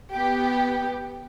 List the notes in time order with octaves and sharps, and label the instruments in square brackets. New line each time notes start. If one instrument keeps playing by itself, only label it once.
[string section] B3 G4